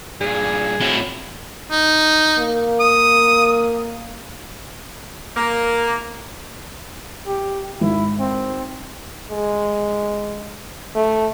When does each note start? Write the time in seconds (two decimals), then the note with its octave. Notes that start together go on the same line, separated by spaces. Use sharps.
0.21 G2 A#2 G#4
0.81 A2 C4 F#4
1.71 D#4
2.38 A#3
2.80 D#6
5.37 A#3
7.27 G4
7.81 G#1 E4
8.20 C4
9.31 G#3
10.95 A3